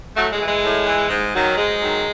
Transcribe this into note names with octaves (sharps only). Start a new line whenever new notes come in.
A2 F#3 A3
G#3
E3
G#3
A2
E3
G#2
D#3 F#3
G#2 G#3
D#3 F#3